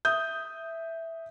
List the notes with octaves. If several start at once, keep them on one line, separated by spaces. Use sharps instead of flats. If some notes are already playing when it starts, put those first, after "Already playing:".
E5 D#6 G6